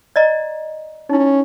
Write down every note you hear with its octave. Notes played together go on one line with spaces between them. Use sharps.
D5 D#5 A#5
C#4 D#4 E4